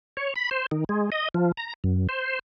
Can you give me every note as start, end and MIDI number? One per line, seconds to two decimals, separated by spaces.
0.17 0.34 73
0.36 0.49 83
0.51 0.66 72
0.71 0.84 51
0.89 1.10 56
1.12 1.29 75
1.34 1.52 53
1.57 1.73 82
1.84 2.07 42
2.09 2.39 72